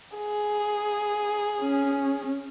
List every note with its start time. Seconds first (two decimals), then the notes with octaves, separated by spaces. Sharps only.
0.17 G#4
1.61 C#4